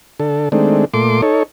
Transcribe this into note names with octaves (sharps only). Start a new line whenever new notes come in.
D3 A4
D#3 G#3 A3 C4 D4
A#2 A3 C6 D6
D#4 A4 C#5